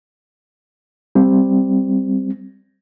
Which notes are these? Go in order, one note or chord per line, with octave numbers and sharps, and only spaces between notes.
G3 C4